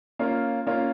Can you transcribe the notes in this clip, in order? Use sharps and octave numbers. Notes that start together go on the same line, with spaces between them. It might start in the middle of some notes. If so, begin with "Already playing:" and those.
A#3 C#4 F4
A#3 C#4 F4